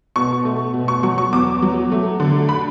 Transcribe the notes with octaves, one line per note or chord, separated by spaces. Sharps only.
B2 C#6
A3
B2
C#6
F#3 C#6
C#6
E2 D6
F#3
A3
D3
B5